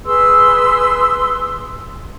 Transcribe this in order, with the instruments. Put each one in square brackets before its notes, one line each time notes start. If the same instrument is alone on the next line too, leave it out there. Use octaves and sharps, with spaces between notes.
[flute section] G#4 B4 C6 E6